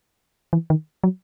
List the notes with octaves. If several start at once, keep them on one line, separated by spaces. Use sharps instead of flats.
E3
D#3
F#3